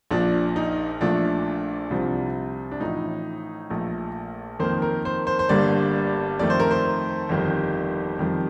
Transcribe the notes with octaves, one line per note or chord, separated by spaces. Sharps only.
A#1 A#2 F3 D4
D#4
A#1 A#2 F3 A3 D4
C2 C3 F3
D4
A1 A2 F3 D#4
A#1 A#2 A3
F2 D#3 A#3 C5
A#4
C5
C5
C5
G1 G2 D3 G3 A#3 D5
F2 D#3 A3 D5
C5
A#4
C5
G1 F2 D#3 G3
F2 D#3 G3